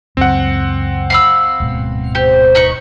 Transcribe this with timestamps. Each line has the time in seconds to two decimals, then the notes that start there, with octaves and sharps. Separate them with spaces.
0.17 C#2 F#2 C4 F#5
1.10 F5 B5 E6
1.60 D1 G#2 B2
2.15 G4 C5
2.55 D#4 B4 C#6